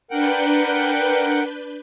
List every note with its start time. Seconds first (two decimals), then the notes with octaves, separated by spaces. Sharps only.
0.11 D4 A#4 B4 F#5 G5 G6